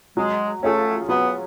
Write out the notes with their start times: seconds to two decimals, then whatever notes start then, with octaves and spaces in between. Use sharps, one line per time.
0.17 F#3 G#3
0.63 A3 C#4 F4 G#4
1.09 F#3 B3